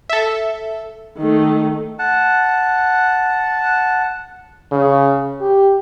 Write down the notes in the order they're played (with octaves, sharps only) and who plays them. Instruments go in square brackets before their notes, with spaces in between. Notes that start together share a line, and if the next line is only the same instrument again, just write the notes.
[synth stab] A4 E5
[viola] D#3 A3
[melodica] F#5 A5
[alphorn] C#3
G4